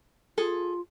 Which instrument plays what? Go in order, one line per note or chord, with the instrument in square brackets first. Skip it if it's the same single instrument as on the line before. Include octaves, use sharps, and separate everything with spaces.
[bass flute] F4 [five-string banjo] G#4 A4